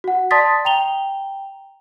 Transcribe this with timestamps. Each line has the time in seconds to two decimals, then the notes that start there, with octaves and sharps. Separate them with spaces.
0.04 F#4 F#5
0.31 D5 A5 C6 D#6 A6 B6
0.65 G5 A#5 F7 G7